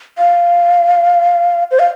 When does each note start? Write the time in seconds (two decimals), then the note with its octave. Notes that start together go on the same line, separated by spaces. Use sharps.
0.18 F5
1.71 C5
1.79 F5